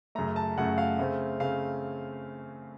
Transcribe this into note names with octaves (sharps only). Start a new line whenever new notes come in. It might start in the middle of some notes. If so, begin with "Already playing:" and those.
F#2 C#3 A3 A#5
A5
F#2 C#3 A3 F#5
F5
C#3 A3 C4
C#3 A3 C4 F5